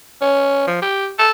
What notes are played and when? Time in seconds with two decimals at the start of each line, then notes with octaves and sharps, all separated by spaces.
0.21 C#4
0.67 F3
0.82 G4
1.19 A4